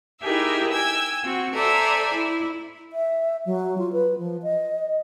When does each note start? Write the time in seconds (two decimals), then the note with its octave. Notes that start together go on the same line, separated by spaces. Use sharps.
0.21 D#4 E4 G4 G#4 A#4 E5
0.71 G5 G#5 E6
1.23 C4 F#4
1.55 A4 C5 D5 E5 G#5 A#5
2.14 E4
2.93 E5
3.46 F#3
3.78 F4
3.93 B4
4.19 F3
4.43 D#5